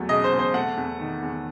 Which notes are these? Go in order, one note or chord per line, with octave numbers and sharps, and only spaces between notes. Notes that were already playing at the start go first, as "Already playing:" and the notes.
Already playing: E2 F#3 A3
C#3 D#5
C5
E2
C5
A3 F#5
E2
D#3
E2